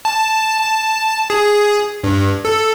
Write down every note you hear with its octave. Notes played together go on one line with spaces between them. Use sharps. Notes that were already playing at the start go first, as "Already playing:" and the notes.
A5
A5
G#4
G2
A4